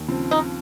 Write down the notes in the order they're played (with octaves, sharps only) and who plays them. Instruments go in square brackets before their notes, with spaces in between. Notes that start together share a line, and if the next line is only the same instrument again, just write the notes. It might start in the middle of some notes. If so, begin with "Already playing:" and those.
Already playing: [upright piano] D#2
C#3 F3 C4
[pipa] D#4